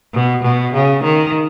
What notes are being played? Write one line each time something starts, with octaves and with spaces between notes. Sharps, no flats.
B2
B2
C#3
D#3